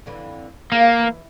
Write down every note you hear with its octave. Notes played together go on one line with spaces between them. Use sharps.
F2 D3 E3
D#2 A#3 G#4 F5
E3